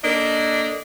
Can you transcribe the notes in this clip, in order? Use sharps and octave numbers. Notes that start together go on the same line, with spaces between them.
A#3 D4 A4 D#5